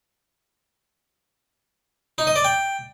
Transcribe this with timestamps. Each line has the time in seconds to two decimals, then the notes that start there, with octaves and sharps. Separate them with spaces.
2.18 D#4
2.27 D#5
2.36 D5
2.44 G5